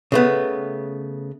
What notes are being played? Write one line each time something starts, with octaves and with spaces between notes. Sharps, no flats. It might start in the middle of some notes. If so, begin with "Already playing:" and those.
C#3 A3 B3